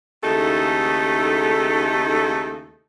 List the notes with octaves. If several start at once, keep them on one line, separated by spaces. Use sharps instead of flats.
D#2 C#3 A3 D#4 E4 A4